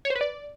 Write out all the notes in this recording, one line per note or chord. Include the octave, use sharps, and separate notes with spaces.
C#5
C5
B4
D5